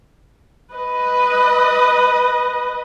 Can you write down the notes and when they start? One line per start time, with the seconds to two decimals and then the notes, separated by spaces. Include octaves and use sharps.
0.75 B4 D#5